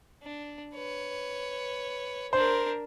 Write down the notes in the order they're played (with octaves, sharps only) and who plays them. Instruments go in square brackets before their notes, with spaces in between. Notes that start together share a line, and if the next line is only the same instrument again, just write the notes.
[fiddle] D4
B4 C#5
[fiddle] D4 A#4 [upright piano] C5